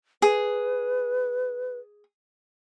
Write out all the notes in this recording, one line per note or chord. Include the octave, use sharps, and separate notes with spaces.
G#4 B4